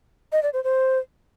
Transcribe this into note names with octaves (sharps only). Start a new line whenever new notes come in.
D#5
D5
C5
C5